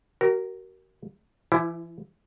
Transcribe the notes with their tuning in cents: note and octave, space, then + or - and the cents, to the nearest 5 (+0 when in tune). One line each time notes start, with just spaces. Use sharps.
F#4 +35 A#4 +0
E3 +35 E4 +0